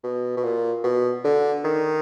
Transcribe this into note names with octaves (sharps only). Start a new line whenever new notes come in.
B2
B2
A#2
B2
D3
D#3